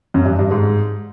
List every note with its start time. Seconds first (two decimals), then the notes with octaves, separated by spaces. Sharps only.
0.14 F#2
0.25 G2
0.39 G2
0.51 G#2